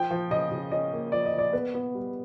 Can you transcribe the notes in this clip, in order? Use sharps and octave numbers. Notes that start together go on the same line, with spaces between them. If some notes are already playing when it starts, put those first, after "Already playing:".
Already playing: F3 G5
F3
C#3 D#5
C#3
C#4 D#5
A#3
F3 D5
D#5
F3
D5
B3 B4
B3
G3